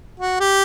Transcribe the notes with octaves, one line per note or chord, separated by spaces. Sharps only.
F#4
G4